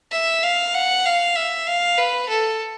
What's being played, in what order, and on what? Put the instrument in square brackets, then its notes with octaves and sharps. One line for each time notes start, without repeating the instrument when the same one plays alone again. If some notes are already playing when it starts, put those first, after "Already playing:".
[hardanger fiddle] E5
F5
F#5
F5
E5
F5
B4
A4